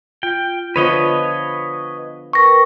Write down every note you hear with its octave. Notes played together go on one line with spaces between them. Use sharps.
F4 G5
D3 F3 B3 B4 C#5 D#5 D#6
A#4 B4 G5 C#6 A#6